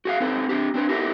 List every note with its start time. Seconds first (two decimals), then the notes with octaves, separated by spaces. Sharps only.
0.05 F#4 G#4 F5
0.20 C4 D#4 A4 B4
0.49 C4 D4 G4
0.74 C4 D4 B4
0.89 D#4 E4 G4 A4 A#4